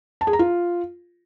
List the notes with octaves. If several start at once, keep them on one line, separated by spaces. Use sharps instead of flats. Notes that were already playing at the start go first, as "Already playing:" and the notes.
A5
G#4
A#5
F4